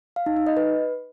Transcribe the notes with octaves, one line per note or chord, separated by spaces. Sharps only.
F5
D#4
D#4
D#5
B4